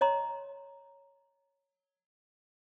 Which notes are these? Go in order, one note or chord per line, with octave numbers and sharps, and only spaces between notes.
C#5 D#5 A#5 C6